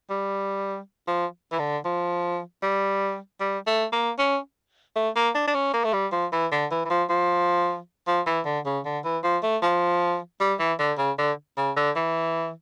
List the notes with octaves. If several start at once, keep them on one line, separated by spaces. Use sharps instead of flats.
G3
F3
E3
D3
F3
G3
G3
A3
A#3
C#4
A3
A#3
D4
D4
C#4
A#3
A3
G3
F3
E3
D3
E3
E3
F3
F3
F3
E3
D3
C#3
D3
E3
F3
A3
F3
G3
E3
D3
C#3
D3
C#3
D3
E3